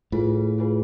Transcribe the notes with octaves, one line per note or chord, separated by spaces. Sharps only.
A2 F4 G#4 B4
F4 G#4 B4